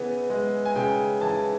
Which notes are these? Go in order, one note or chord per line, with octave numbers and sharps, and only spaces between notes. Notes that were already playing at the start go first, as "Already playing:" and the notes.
Already playing: C#3 E3 B3
G#3
G#5
C#3 G5
E3 A5